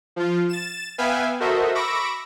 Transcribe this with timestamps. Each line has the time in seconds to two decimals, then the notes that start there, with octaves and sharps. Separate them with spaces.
0.16 F3 F4
0.49 A6 E7
0.98 B3 B4 E5 F5 G5 G#5
1.40 F#4 A4 A#4 C5 D#5 E5
1.75 B5 C#6 D6 E6 A#6 D7